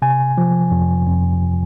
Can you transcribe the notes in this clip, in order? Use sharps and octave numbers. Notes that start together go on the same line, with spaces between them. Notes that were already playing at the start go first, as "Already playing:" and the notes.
C3 G#5
F3
F2
F2